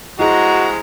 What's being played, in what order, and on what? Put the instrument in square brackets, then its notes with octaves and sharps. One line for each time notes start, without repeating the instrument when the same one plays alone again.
[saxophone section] G2 F3 G#3 [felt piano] E4 G#4 [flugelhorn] F#4 [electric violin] A#5